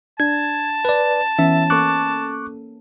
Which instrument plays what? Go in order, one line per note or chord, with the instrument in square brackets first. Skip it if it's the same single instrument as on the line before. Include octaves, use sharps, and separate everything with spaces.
[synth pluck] D4 [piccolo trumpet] A5 [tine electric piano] G#6
[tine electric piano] B4 D5
[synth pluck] E3 B3 C#4 [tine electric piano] E5
[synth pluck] A#3 C#4 A4 [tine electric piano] C#6 D6 F#6